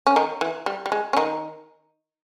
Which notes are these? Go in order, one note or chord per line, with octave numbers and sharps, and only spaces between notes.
C#4
D#3 D#4
E3
G3
G3
G#3
C#4
D#3 D#4